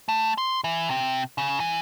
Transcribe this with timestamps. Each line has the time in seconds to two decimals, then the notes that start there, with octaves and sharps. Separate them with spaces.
0.09 A3
0.38 C6
0.64 E3
0.90 C3
1.38 C#3
1.60 E3